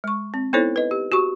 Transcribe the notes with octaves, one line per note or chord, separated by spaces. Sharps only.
G#3 C#6
C4
B3 D#4 E4 A4 C5 C#5
B4 D#5
G4
F#4 G4 C#6